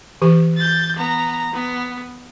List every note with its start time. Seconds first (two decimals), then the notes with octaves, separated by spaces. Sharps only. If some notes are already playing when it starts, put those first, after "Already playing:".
0.22 E3 G4
0.58 G6 A6
0.96 B3 A#5
1.53 B3